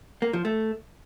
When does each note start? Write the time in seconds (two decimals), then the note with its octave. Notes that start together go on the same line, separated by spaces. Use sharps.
0.22 A#3
0.33 F3
0.45 A3